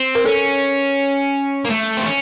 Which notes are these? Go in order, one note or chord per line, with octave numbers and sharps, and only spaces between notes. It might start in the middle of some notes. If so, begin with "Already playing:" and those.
Already playing: C4
A#4
C#4 A4
A#3
A3
C4
C#4